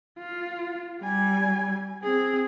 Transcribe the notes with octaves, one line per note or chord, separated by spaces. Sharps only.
F4
G3 G#5
C4 G#4